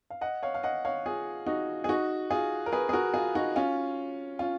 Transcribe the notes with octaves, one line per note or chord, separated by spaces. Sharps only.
F5
D#5 F#5
C#5 F5
F5
D#5 F#5
C#5 F5
F4 G#4
D#4 F#4
G#4
D#4 F#4
F4 G#4
A#4
G#4 B4
G#4
F#4 A#4
F4 G#4
D#4 F#4
C#4 F4
C#4 F4